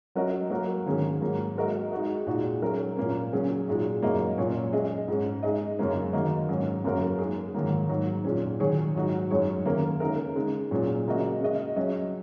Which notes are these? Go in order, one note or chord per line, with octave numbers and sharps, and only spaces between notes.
F#3 C#4 F#4 A#4 D#5
F#3 A#3 F#4 A#4
G#2 D#3 A#3 C#4 G#4
G#2 F#3 A#3
G#3 F#4 A#4 D#5
G#3 D#4 F#4 D#5
A#2 G#3 D#4 F#4
F#3 C#4 A#4 C#5
A#2 A#3 C#4
C#3 F#3 C#4 G#4
A#2 G#3 D#4 F#4
F#2 C#3 A#3 F#4 D#5
A#2 F#3 C#4 G#4 C#5
G#3 C#4 G#4 D#5
G#2 G#3 C#4
G#3 D#4 G#4 D#5
F#2 C#3 F#3 A#3 C#4
D#3 A#3 F#4 D#5
G#2 F#3 C#4 G#4
F#2 C#3 A#3 F#4 A#4
G#3 D#4 G#4
G#2 D#3 F#3 A#3
G#2 F#3 D#4
A#2 G#3 C#4
D#3 F#3 D#4 G#4 C#5
G#2 F#3 D#4 F#4
F#2 F#3 D#4 G#4 C#5
D#3 A#3 C#4 A#4
C#3 G#3 D#4 A#4
C#3 G#3 D#4
A#2 F#3 C#4 G#4
C#3 A#3 F#4 D#5
C#3 G#3 F#4 D#5
F#3 C#4 F#4 D#5